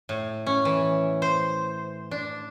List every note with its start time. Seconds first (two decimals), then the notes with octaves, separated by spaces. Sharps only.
0.09 A2
0.46 C#4
0.65 E3
1.22 C5
2.11 D4